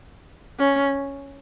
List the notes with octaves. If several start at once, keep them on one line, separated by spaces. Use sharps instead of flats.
C#4